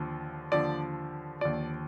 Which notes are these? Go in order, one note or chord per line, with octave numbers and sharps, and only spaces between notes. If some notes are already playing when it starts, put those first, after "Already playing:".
Already playing: D#2 D3 F3
D#2 D3 F3 D5
D#2 D3 F3 D5